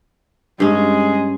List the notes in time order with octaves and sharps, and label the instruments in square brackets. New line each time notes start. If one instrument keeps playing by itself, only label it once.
[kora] G2 C#4 [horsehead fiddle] G#3 G#4